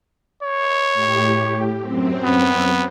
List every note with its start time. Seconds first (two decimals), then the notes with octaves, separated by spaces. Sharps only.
0.43 C#5
0.94 A2 G4
1.80 F#2 C4
2.24 B3